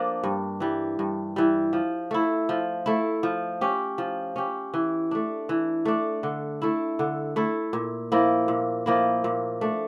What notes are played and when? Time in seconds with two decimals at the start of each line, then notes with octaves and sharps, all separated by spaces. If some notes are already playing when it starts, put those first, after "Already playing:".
Already playing: F3 A#3 D4
0.24 G2
0.60 E3 G3
0.99 G2
1.36 E3 G3
1.73 F3
2.11 A3 E4
2.49 F3
2.86 A3 E4
3.23 F3
3.61 C#4 G4
3.98 F3
4.36 C#4 G4
4.74 E3
5.11 A3 D4
5.49 E3
5.85 A3 D4
6.23 D3
6.62 A3 E4
6.99 D3
7.36 A3 E4
7.73 A#2
8.12 F3 A#3 E4
8.48 A#2
8.86 F3 A#3 E4
9.24 A#2
9.61 A3 D4